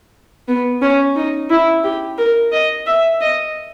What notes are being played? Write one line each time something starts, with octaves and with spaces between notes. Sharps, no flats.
B3
C#4
D#4
E4
G4
A#4
D#5
E5
D#5